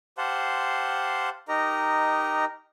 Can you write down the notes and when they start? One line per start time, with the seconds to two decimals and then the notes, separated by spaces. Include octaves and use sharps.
0.18 G4 C5 F5 F#5 A5 C6
1.48 D#4 G4 A#4 D#5 A#5